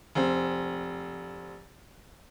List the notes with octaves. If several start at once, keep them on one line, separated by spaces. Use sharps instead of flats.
F1 C4